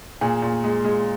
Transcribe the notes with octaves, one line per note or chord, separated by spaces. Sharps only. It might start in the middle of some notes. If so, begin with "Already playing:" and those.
A#2 G#4
A#2
G#3
G#3